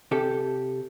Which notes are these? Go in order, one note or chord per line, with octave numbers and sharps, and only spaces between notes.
C3 G4 A4